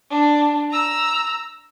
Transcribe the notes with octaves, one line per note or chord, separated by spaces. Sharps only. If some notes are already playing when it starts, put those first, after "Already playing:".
D4
A#5 E6